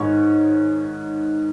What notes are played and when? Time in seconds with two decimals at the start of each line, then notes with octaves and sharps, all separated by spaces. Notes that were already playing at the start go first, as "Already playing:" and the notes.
Already playing: G#2 D#3 C#5